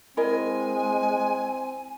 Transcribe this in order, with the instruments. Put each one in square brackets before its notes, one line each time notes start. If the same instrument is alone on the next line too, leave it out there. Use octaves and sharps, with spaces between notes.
[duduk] G#3 [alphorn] C4 [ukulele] E4 A#4 D#5 [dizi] G#5